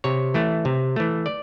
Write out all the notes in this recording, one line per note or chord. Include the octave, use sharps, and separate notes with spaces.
C3 C#5
E3 A3
C3
E3 A3
D5